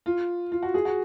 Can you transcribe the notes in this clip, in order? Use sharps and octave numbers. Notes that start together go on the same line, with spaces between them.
F4
F4
F#4
G#4
F#4